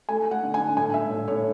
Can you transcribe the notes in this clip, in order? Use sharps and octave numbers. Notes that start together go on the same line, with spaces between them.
A3 G#5
A3
F#5
D3
G#5
D3
A2 G#5
A2 E5
A2
A2 C#5